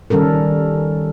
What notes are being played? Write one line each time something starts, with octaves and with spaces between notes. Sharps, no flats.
D#3 G3 C#4 A4 A#4